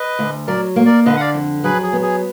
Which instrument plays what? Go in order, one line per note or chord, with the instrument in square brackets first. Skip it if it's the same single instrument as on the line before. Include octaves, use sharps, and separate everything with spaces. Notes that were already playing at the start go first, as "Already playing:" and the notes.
Already playing: [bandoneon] B4 D#5
[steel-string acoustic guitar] D2
[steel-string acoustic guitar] F#3 [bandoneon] A#4 D5
[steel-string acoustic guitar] A#3
[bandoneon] A#4 D5
[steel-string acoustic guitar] D3 [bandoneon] B4 D#5
[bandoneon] F#5
D5 F5
[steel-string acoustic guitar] F2
[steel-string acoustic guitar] F#3 [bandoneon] G#4 B4
[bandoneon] G#4
[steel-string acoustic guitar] B3
[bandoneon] G#4